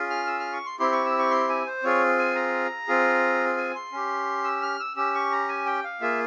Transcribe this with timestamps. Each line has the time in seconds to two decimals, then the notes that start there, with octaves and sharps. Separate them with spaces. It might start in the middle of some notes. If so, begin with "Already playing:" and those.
Already playing: C#4 F4 G#4
0.10 F6
0.27 E6
0.40 F6
0.53 C#6
0.66 C6
0.80 C4 E4 G4 C6
0.92 C#6
1.05 E6
1.19 C#6
1.31 C6
1.49 G#5
1.66 C5
1.83 C4 F4 G#4 C#5
2.18 G#5
2.35 A#5
2.88 C4 F4 G#4
3.57 G#5
3.75 C6
3.92 C#4 G4
4.44 E6
4.62 F6
4.80 E6
4.97 C#4 G4 E6
5.15 C#6
5.32 A#5
5.49 G#5
5.66 G5
5.84 F5
6.01 A#3 F4 G#4 E5